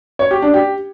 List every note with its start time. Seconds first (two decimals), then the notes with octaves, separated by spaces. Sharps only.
0.19 C#5
0.31 G4
0.42 D4
0.54 G4